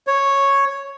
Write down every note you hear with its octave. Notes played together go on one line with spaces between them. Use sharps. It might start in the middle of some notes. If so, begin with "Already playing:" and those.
C#5